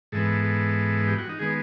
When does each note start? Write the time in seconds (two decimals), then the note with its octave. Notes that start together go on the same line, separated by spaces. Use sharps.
0.12 G#2 E3 G#3 B3 A4
0.44 A4
1.08 G4
1.19 F#4
1.29 D#4
1.39 D#3 G#3 B3 G#4